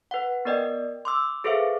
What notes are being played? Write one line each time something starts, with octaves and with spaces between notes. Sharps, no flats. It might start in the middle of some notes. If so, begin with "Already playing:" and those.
B4 F#5
B3 A#4 D5 D#5 G5
C6 D6 E6
G#4 A4 B4 C5 E5 F5